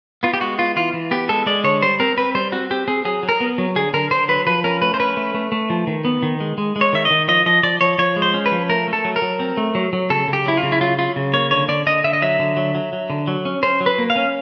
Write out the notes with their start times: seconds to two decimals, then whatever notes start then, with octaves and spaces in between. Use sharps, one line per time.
0.23 B3 F4
0.34 G4
0.41 G#3 F#4
0.58 B3 F4
0.76 E3 F4
0.93 E3
1.11 B3 G4
1.29 G#3 A4
1.46 G#3 D5
1.64 D3 C#5
1.82 G3 C5
2.00 C4 A#4
2.17 C4 B4
2.35 G3 C5
2.52 C4 F#4
2.71 C4 G4
2.88 C4 G#4
3.05 F#3 G#4
3.23 F#3
3.29 A#4
3.40 B3
3.58 F#3
3.76 D3 G#4
3.94 D3 A#4
4.11 D3 C5
4.28 F#3 B4
4.47 F3 B4
4.64 C#4 A#4
4.82 A3 B4
4.94 C5
5.00 C#4 B4
5.17 A3
5.34 A3
5.52 A3
5.70 F3
5.87 D#3
6.05 B3
6.22 D#3
6.40 G#3
6.58 G#3
6.76 G#3
6.81 C#5
6.93 D#3 E5
7.05 D#5
7.10 D#3
7.28 F3 D#5
7.46 F3 D#5
7.63 F3 D5
7.81 F3 C#5
7.98 F3 C#5
8.16 G#3
8.22 C5
8.34 C#4
8.46 B4
8.52 F3
8.69 A3 A#4
8.87 A3
8.93 A4
9.05 F#3
9.16 A#4
9.22 F#3
9.40 C4
9.57 A3
9.75 F#3
9.93 F#3
10.10 C#3 A4
10.28 C#3
10.33 G4
10.46 F#3 E4
10.57 F4
10.63 C#3
10.72 E4
10.81 F#3 F4
10.98 F#3 F4
11.16 C#3
11.34 A#3 C#5
11.51 D3 C#5
11.68 D3 D5
11.86 D3 D#5
12.04 D3 E5
12.13 D#5
12.22 F#3 E5
12.39 D3
12.57 F#3
12.75 F#3
12.93 F#3
13.10 D3
13.28 F#3
13.45 C#4
13.63 C#4 C5
13.81 F#3
13.86 B4
13.98 A#3
14.10 F5
14.16 C#4